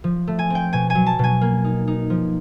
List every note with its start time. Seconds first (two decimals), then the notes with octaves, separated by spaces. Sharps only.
0.04 F3
0.27 A3
0.39 G#5
0.50 C4 G5
0.73 B2 G#5
0.90 G#5
0.95 F#3
1.06 A5
1.19 B2 G#5
1.41 A#3
1.64 D#4
1.88 D#4
2.10 F3